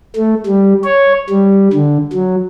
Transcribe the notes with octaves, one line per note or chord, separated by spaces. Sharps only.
A3
G3
C#5
G3
D3
F#3